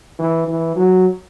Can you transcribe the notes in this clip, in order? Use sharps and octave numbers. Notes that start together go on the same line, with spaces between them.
E3
E3
F#3